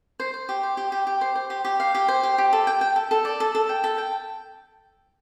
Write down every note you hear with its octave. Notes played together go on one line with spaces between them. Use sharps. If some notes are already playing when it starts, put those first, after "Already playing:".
C5
C5
G4
C5
G4
G4
G4
C5
C5
G4
G4
F5
G4
C5
G4
G4
A4
G5
G5
A4
A4
D5
A4
A4
G5
A4
G5